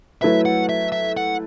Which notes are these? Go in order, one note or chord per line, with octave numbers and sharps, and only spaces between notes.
F#3 A3 E4 B4 E5
F#5
E5
E5
F#5